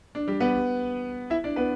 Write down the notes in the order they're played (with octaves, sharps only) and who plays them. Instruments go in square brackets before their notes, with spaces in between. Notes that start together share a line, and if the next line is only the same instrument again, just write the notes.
[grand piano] D4
G3 G4
B3 B4
E4 E5
D4 D5
B3 B4